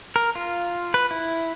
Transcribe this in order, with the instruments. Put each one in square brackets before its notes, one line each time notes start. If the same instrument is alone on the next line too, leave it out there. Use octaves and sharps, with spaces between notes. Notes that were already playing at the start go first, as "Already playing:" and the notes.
[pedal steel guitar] A#4
F4
B4
E4